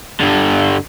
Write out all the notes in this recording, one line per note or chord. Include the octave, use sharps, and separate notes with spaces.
G2 D3